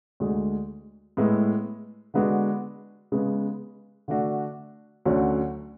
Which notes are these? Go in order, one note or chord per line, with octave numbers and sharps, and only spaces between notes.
D2 D3 G#3
A2 G#3 B3 E4
D3 G#3 B3 D4 F#4
C#3 G#3 B3
D3 A3 D4 F#4
D2 D3 F#3 C#4 F#4